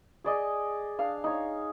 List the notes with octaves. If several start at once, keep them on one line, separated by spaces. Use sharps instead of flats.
G#4 D5 D#5
D4 F5
D#4 C#5